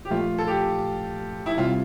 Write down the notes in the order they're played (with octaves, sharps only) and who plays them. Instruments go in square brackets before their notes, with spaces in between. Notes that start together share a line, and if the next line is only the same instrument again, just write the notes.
[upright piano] G4
[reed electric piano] A#2 F3 A3 [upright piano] F4
[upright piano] A4
G4
E4
[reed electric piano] C3 G3 C4 [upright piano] F4